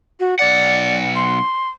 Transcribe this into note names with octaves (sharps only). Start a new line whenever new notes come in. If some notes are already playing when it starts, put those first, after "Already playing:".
F#4
B1 D5 F#5
C6